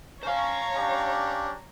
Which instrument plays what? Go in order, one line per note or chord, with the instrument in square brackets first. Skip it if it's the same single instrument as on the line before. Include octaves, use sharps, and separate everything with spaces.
[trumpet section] C#4 [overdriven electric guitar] C5 F5 [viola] C#5 A#5
[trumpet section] C#4 D4 G4